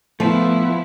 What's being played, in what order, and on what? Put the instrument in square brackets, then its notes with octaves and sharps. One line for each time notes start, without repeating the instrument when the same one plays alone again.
[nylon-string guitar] F3 [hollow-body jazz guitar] A3 [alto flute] B3 [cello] E4